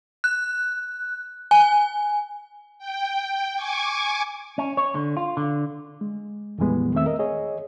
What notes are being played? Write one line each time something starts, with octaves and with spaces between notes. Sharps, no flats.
F#6
G#5
G5
G#5 C#6 D6 G#6
C#4
C#5
D3
F4
D3
G#3
F2 A#2 E3 G3 G#3 B3
E2 D#3 A3 C4 E5 E6
A#4 D#5
G#4 C#5 D#5